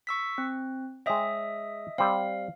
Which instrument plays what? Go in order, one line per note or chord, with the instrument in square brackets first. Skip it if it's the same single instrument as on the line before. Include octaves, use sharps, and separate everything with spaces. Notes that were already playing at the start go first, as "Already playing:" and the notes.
[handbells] C#6 E6 B6
C4
[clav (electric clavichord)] G#3 C#5 G5 [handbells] D#5 E5 D#6
[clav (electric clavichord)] G3 C4 [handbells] F5